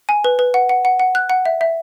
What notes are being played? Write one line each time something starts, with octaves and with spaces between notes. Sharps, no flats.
G#5
B4
B4
F#5
F#5
F#5
F#5
F#6
F#5
E5
E5